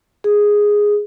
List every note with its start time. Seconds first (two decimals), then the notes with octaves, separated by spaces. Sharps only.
0.24 G#4